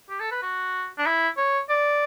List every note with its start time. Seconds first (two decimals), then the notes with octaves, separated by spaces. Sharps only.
0.10 G4
0.20 A4
0.31 B4
0.42 F#4
0.98 D4
1.06 E4
1.37 C#5
1.69 D5